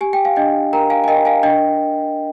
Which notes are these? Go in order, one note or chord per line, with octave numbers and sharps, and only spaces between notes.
G4 G#5
G5
F5 G#5
D4 D#5 G5
A#4 G5 A#5
F5 G#5
G#5
A#4 D#5 G5
F5 G#5
D4 D#5 G5